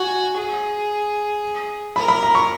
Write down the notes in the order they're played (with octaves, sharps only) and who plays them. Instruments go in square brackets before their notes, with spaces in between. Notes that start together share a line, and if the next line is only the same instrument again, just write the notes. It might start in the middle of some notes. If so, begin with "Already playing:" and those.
Already playing: [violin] F#4 [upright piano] G#5
[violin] G#4
[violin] A#4 [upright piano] B5
[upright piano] B5
A#5
C#6